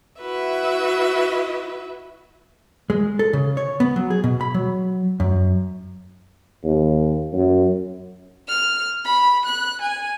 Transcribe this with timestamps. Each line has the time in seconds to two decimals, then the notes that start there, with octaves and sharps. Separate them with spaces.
0.20 E4 F#4 B4 E5
2.90 G#3
3.19 A4
3.33 C#3
3.57 C#5
3.80 B3
3.96 F#3
4.10 G#4
4.24 B2
4.41 B5
4.54 F#3
5.20 F#2
6.64 D#2
7.33 F#2
8.48 F6
9.05 B5
9.45 F#6
9.81 G#5